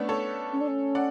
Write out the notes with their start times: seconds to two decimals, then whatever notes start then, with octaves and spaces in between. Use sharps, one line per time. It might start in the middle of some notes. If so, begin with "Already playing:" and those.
Already playing: A3 B3 C#4 D4
0.09 A4 C#5
0.52 C#4
0.61 D4
0.68 C#4
0.95 D5 F#5